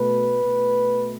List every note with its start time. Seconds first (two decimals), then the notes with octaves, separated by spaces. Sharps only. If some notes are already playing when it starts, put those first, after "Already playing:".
Already playing: B2 A3 B4
0.43 B2 A3